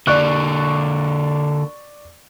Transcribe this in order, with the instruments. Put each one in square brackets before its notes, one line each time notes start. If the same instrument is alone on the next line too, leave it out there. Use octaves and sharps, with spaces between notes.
[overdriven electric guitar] D3 A#3 [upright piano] D5 C#6 F#6